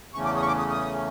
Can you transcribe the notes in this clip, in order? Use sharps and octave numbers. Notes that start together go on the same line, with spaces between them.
E2 C#3 E3 A3 C#4 C#6
D6
D#6
C#6
D6
D#6
D#6